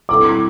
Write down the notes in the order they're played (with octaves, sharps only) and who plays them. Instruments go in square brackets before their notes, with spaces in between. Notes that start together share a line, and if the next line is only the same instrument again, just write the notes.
[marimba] B2 G3 C4 E4 A4 [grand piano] D6